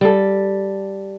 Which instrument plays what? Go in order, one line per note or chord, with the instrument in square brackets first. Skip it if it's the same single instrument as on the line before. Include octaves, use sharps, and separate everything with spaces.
[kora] G3 A4